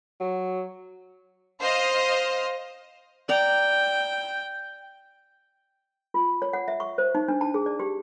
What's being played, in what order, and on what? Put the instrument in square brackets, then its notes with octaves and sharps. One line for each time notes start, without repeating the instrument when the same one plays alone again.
[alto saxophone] F#3
[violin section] C5 D#5 F5
[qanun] D5 A#5 [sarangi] G5
[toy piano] F4
C#5
F#5
E5
C#6
C5
D#4
D4
A5
G#4
D5
G4